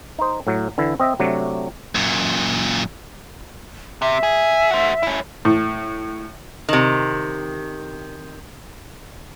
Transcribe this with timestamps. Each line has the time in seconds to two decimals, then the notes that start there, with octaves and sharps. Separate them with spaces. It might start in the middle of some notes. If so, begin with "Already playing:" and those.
0.19 D#4 C5
0.47 A2 F#3
0.78 D3 E3 E4
1.00 C4 D#5 E5
1.19 C3 F#3 A3 D4
1.95 F#2 A#2
4.02 C3 E5
4.23 G#4
4.71 F#4 C5
5.03 C#4 E4
5.45 A2
6.69 C3 D#3